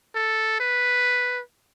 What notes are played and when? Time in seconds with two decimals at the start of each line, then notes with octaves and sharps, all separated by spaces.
0.15 A4
0.60 B4